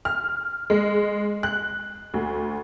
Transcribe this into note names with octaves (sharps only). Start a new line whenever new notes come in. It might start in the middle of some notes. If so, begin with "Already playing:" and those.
F6
G#3
F#6
D2